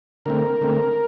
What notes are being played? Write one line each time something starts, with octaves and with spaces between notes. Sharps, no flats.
D3 A3 C4 A#4
D3 A3 C4